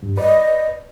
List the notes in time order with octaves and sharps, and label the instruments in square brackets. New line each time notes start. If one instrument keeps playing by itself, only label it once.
[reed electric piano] G2
[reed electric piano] B4 D5 [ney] D#5